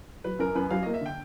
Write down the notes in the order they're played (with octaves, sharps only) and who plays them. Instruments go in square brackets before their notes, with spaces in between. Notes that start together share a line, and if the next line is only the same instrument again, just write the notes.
[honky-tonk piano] F#3 [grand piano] B4
[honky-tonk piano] F#2 [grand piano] A#4
[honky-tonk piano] F#2 [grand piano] B4
[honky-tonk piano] F#3 [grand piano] F5
[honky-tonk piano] A#3 [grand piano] D#5
[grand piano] E5
[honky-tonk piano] D3 [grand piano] G5